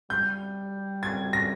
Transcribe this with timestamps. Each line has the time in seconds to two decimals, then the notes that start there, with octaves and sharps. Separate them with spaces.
0.10 G3 G6
1.03 G#6
1.33 A#6